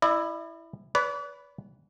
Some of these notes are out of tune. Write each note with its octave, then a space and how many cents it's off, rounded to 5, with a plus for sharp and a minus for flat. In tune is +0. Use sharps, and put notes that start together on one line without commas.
E4 +0 D5 +45
B4 +0 D5 -45